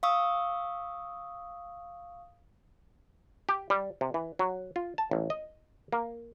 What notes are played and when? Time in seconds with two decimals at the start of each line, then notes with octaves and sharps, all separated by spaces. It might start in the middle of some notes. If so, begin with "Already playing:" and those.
0.03 F5 C#6 D#6 E6
3.49 G4
3.70 G3
4.01 C3
4.14 E3
4.39 F#3
4.76 F4
4.98 A5
5.11 A1
5.30 D#5
5.93 A#3